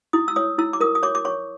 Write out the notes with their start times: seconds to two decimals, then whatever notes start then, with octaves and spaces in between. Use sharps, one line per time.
0.13 E4 D#6
0.28 E6
0.36 C#5 D#6
0.58 E4 E6
0.73 D6
0.81 A#4 D#6
0.95 D#6
1.03 C#5 D6
1.15 D6
1.25 C#5 C#6